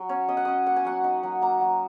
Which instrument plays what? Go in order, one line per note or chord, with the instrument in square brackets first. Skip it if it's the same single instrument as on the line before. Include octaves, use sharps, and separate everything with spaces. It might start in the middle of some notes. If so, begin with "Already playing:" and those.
Already playing: [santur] F#3
C#4 C#5
C#4 D#5
F#5
C#4 D#5
A#3 F#5
G#5
F#3 F#5
D#4
F#3
A#3 A#5
F#3